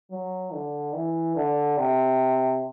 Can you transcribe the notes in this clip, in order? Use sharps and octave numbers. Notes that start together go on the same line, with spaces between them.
F#3
D3
E3
D3
C3